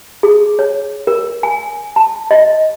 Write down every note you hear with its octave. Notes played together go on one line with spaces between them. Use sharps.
G#4
C#5
A#4
G#5
A5
D#5